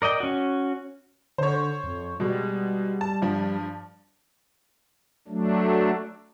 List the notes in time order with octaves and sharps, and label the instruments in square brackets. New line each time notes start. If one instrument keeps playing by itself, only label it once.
[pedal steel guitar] A#4 D5 D#5 G5
C#4 F#4
[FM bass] D3 [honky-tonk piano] C5 C#5
[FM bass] F2
[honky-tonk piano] B2 G#3 [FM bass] G3
[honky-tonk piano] A5
G2 F3
[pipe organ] F#3 A3 D4